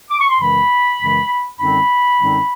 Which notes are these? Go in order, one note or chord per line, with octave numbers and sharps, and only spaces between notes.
D6
C#6
C6
F#2 C#3 E3 G#3 B5
F#2 C#3 E3 G#3
F#2 D3 G3 C4 D#4 B5
F#2 D3 G3 C4 D#4